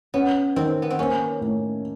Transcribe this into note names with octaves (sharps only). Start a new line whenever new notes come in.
B3 C#4
D#3 C4
B3
C4
A#3 C#4
A2